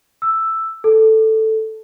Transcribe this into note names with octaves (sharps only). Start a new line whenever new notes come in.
E6
A4